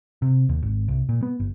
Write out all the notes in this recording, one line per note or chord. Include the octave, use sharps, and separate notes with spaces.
C3
D#2
G#1
C2
A#2
B3
G1